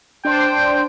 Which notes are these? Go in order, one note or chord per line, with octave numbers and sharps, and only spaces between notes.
D4 C5 G5